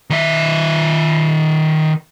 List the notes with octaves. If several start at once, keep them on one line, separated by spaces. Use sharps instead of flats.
D#3 E5